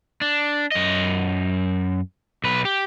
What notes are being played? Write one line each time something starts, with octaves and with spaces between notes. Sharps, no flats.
D4
F#2 D#5
B1 B4
G4